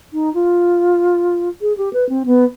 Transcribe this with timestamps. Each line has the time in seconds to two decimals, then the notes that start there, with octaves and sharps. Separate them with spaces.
0.13 D#4
0.34 F4
1.62 G#4
1.78 G4
1.93 B4
2.09 C4
2.26 B3